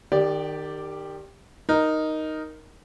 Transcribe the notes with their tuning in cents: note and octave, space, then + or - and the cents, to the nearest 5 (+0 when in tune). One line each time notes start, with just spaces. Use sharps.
D#3 -25 G4 +10 D5 +0
D#4 +0 A#4 +5